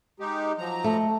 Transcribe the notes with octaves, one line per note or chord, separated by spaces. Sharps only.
G#3 D#4 G4
F3 F#3 A#5
A3